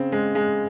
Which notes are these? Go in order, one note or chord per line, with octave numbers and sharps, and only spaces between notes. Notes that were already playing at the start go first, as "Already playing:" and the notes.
Already playing: C#3 C4
G#3
G#3